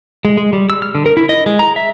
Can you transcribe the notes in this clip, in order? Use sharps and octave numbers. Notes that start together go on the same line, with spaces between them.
G#3
G#3
G3
E6
F6
D3
A#4
E4
D#5
G#3
A#5
E5